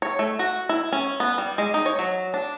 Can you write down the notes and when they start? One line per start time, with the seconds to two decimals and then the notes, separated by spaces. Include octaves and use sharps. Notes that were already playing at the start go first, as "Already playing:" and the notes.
0.02 C#5
0.19 A3
0.39 F#4
0.69 E4
0.92 C#4
1.20 B3
1.38 G3
1.58 G#3
1.74 D#4
1.86 C#5
1.99 F#3
2.34 D4